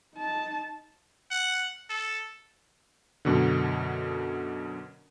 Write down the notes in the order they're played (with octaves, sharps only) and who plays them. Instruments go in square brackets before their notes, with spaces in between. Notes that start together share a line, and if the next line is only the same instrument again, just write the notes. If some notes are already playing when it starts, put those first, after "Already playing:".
[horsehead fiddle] D#4 A5
[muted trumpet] F#5
A4
[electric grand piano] F#2 B2 D3